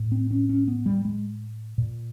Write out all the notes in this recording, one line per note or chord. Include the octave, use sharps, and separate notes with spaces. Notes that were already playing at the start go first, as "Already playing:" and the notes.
Already playing: A2
C4
C#4
C#4
B3
G3
G#3
A#2